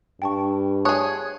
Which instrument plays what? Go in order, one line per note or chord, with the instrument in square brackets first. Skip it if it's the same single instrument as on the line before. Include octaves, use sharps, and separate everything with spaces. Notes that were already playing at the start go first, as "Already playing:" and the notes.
[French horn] G2 [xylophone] G5 A5 C#6
[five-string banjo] G#4 C#5 [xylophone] A5 D#6 F#6